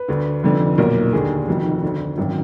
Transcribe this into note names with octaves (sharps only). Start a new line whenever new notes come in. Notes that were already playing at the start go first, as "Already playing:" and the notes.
Already playing: B4
D2 D3
F1 F2 D3
B1 A#2 A#4
D#2 D3 G#4
F1 F2 D#3 F#4
D2 D3
G#1 F#2 D#3